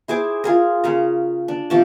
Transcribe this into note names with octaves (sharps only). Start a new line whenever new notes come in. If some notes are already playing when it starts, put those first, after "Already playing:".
E4 G#4 C5 D6
F4 G#4 A#4
C#3 A#4 A#5
D4
C3 F3 A5